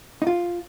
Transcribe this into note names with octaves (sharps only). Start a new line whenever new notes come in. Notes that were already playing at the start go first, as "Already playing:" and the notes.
D#4
F4